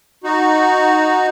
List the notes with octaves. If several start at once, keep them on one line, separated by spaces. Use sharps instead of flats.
D#4 F#4